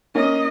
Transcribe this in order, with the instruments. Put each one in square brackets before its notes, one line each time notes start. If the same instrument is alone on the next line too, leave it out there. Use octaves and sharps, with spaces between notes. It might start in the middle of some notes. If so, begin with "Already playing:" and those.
[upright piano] A#3 C#4 [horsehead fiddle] D#5